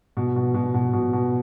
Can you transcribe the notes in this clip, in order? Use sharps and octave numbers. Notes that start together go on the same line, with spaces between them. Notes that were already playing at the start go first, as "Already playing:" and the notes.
B2
B2
B2
B2
B2
B2